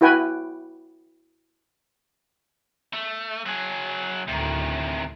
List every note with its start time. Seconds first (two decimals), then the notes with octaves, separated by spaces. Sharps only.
0.01 E4 F#4 B4 G5 G#5
2.93 A3
3.46 F#3 G#4
4.28 D2 A2 C3 D#3